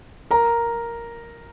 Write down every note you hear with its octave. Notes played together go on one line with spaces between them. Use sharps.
A#4 A#5